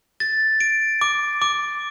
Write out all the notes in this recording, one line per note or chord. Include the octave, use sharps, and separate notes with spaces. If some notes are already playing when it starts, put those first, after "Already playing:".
A6
D7
D6
D6